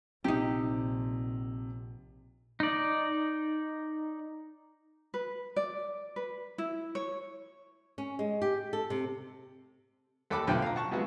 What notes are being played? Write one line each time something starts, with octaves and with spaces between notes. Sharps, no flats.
A#1 C3 D#4 G4
D#4 D5
B4
D5
B4
E4
C#5
C#4
G#3
G4
A4
C3
D#2 A4 F#5 B5 D6
B1 A2 D3 F3 C4 G5
F5 A#5
F#5 A5 C#6
C3 F3 G#3 B3 F#4